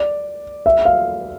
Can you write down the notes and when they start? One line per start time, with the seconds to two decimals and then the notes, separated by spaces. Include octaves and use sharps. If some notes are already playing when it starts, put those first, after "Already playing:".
Already playing: D5
0.66 E5
0.85 F5